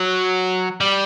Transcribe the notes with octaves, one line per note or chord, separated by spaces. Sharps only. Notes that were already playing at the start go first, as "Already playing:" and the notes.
Already playing: F#3
G3